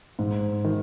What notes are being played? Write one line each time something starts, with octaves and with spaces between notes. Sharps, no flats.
G#2
D#3